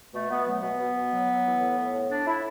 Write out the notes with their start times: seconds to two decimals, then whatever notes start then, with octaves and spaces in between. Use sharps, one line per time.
0.13 B2 A3
0.29 B2 B3
0.45 F#3 A3
0.62 B2 B3
0.78 B2
0.95 B2
1.11 F#3
1.28 F#3
1.44 E3
1.60 A2
1.76 A2
1.93 A2
2.09 A2 D4
2.25 A2 E4